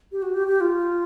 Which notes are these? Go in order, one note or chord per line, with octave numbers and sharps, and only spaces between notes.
G4
F#4
G4
G4
F4